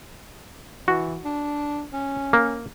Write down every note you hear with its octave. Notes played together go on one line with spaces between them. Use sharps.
E3 F#4
D4
C#4
A#3